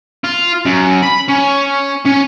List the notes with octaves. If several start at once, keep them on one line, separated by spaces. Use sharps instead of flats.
F4
F#2
B5
C#4
C#4